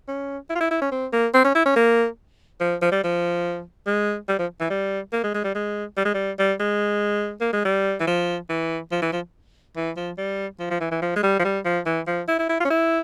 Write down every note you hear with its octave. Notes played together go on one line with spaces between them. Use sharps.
C#4
E4
F4
E4
E4
C#4
C4
A#3
C4
C#4
E4
C#4
A#3
F3
F3
G3
F3
G#3
G3
F3
E3
G3
A#3
G#3
G#3
G3
G#3
G3
G#3
G3
G3
G#3
A#3
G#3
G3
E3
F3
E3
F3
E3
F3
E3
F3
G3
F3
F3
E3
E3
F3
G#3
G3
F3
G3
F3
E3
F3
E4
E4
E4
F4
C#4
E4